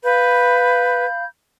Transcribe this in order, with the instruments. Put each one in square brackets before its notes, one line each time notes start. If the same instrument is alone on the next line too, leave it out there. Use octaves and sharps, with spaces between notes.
[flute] B4 [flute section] F5 B5 G6